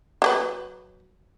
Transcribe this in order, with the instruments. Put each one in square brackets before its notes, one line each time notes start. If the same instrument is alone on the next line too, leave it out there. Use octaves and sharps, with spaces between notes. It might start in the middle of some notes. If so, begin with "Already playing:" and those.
[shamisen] F#3 G4 B4